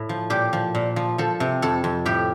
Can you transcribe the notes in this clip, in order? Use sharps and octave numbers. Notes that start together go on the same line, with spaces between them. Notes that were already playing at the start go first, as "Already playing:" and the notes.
Already playing: A2
F3
A#2 G4
F3
A#2
F3
F3 A4
C3
F2 A4
F2
A2 G4